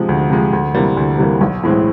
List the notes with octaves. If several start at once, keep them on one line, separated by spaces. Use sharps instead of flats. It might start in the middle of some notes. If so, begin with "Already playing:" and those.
Already playing: C3 F3 G#3
D2
C3 F3 G#3
D2
C3 E3 G3 A#3
D2
C3 E3 G3 A#3
B1
A2 E3 G#3 C4